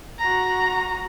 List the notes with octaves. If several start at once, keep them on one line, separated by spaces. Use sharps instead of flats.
F#4 A#5